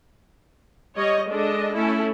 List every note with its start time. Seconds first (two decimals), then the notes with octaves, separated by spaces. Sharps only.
0.96 G3 C#5 D#5
1.28 G#3 D4 A4 D#5
1.75 A3 C#4 E4 A4